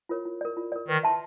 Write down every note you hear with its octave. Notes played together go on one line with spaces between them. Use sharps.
F4 A#4 C#5
F4
A#4 D5
F4
A#4 D5
D#3 B4
E5 A5 C6